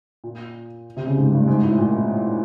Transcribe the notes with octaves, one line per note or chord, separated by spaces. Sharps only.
A#2
C3
C#3
G#2
G2
G#2
A2
A#2